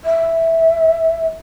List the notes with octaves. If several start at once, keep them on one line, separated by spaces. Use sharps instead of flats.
E5